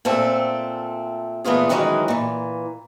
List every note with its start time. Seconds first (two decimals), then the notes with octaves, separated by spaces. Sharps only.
0.05 A#2 A3 C4 A4
1.44 A#2 E3 A3 B3 F4 G#4
1.69 D#3 E3 F#3 G#3 C#4 D#4
2.08 A#2 E3